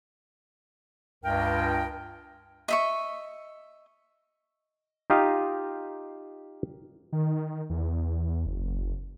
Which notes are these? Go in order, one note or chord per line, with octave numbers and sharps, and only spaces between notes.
C#2 G2 A#4 G5
D#5 E5 C#6
D#4 F4 G4 D#5 F5
D#3
E2
F#1